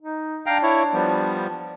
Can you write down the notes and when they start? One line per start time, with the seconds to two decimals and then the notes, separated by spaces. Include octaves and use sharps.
0.02 D#4
0.46 D4 F5 G5 A#5
0.63 E4 C#5
0.93 F3 G3 B3